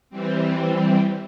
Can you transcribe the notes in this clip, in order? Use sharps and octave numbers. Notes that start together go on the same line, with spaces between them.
E3 G3 C4